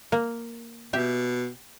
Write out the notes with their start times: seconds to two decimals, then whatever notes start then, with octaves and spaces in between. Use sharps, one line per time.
0.12 A#3
0.93 B2 G4 E5